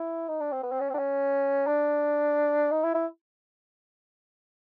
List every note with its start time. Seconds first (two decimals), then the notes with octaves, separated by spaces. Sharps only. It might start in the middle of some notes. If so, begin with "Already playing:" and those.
Already playing: E4
0.28 D#4
0.40 D4
0.52 C4
0.63 B3
0.72 C4
0.80 C#4
0.89 C4
0.94 D4
0.98 C#4
1.66 D4
2.71 D#4
2.83 E4
2.94 E4